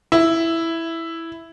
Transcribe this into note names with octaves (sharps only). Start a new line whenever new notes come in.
E4